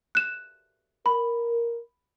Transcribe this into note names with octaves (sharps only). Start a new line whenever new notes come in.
F#6 E7
A#4 B5